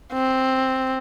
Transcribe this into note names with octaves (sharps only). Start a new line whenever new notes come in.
C4